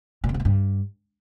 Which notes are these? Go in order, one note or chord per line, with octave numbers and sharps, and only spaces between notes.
A#2
F2
A2
B2
G2